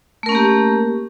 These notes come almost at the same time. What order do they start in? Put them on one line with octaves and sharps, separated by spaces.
A3 A#4 C#4 A#3 G4